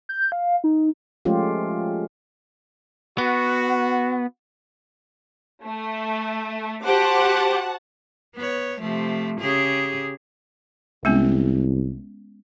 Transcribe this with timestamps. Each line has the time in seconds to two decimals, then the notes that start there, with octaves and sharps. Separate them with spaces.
0.09 G6
0.32 F5
0.64 D#4
1.25 F3 G#3 A3 C#4 F4 G4
3.18 B3 F#4
5.63 A3
6.84 F#4 G4 C5 F#5 A5 D6
8.36 B3 C#5
8.81 C3 F3 A3
9.40 C#3 G4 G#4
11.05 C2 G#3 B3 C#4